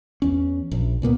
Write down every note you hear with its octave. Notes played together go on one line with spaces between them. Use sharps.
E2 C#4
A#1
C#2 A#2 A#3 B3